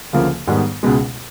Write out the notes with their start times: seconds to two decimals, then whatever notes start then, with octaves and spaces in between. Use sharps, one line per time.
0.13 D2 C#3 F3 A#3
0.47 G#2 D#3 G3 B3
0.83 C#2 B2 G#3